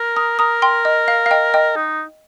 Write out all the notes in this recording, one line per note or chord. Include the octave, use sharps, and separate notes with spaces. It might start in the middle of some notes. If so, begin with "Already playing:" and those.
Already playing: A#4
A#5 D#6
A#4 A#5 D#6
G5 C6
D#5
F5
F5
D#5 G5
D#5 G5
D#4